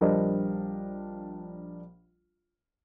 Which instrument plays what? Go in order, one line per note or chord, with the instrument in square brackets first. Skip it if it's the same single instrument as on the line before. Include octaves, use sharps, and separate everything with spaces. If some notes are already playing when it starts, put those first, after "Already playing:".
[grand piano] A#1 G3 D4 A#4 C5 D#5